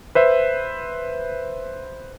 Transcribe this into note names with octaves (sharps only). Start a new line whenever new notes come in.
B4 C5 E5